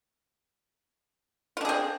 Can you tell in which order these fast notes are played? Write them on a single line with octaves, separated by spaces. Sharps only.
F4 D4 G#4 C4